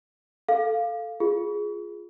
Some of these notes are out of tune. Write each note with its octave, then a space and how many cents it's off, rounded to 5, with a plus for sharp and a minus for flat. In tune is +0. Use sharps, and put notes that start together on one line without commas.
A4 +0 F5 +0
F4 +0 G#4 +0